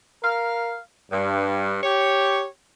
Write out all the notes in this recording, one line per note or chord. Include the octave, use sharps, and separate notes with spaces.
A#4 F5
G2
G4 C#5